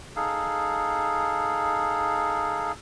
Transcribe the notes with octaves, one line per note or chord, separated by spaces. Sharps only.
D#4 G#4 A4 F5